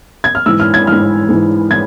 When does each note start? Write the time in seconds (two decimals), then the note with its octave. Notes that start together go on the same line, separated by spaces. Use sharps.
0.24 G#6
0.35 F6
0.46 G#2 E3 E6
0.60 F6
0.74 G#6
0.87 G#2 E3 F6
1.29 G#2 E3
1.71 E3 G#6